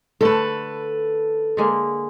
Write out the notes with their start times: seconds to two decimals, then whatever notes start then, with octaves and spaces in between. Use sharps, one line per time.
0.21 D3 A3 A4 B4
1.57 D3 G#3 A#3